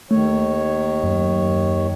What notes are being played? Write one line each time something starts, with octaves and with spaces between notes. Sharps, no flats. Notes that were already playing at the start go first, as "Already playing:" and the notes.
D#2 D#3 A3 C#5
F#2